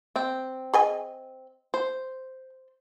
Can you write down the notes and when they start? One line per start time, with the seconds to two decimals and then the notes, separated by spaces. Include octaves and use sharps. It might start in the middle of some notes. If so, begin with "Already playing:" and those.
0.16 C4 G5
0.74 G#4 D#5 G#5
1.74 C5